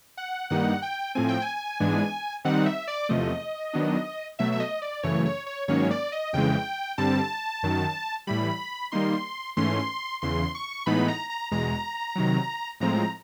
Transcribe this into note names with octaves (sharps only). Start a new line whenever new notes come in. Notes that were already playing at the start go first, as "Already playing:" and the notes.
F#5
G2 D#3 G3 A#3 D#4 F#5
G5
A2 F3 A3 C4 G#5
G5
G#5
G#2 E3 G#3 B3 D4
D#3 G3 C4 D#4 F#5
E5
D5
E2 C3 F3 A3 D#5
D#3 F#3 B3 D4
B2 F#3 A3 E5
E5
D#5
D5
F#2 C#3 E3 A3 C#5
C#5
C#5
G#2 D#3 F#3 A#3 C#4 C#5
D5
D#5
F2 C#3 E3 G#3 G5
G2 D3 G3 C4 A5
F#2 D#3 F#3
A2 E3 G3 B5
D#3 G3 A#3 D#4 C6
G#2 E3 A3 C#4 C6
E2 C#3 E3 C6
C#6
A2 E3 G#3 B3 D#4 B5
A#5
A#5
E2 B2 G#3 A#5
C3 D#3 F#3
A2 F3 G#3 C4 A#5